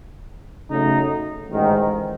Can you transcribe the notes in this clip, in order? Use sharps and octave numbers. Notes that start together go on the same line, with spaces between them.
C#3 F#3 A3 D#4
A1 G#2 D#3 G#3